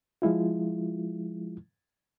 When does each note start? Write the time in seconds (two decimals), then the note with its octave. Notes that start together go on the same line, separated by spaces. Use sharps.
0.22 F3 G#3 E4 F4